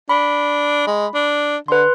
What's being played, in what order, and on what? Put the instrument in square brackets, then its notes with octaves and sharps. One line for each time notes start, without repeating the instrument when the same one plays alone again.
[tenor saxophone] D4 [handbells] B5
[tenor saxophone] G#3
D4
[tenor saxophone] D3 [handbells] B4 C6